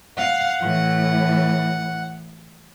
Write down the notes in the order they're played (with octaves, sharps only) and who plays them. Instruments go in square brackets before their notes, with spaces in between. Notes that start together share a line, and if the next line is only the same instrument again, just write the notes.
[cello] F5 [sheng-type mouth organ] F#5
[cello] A2 E3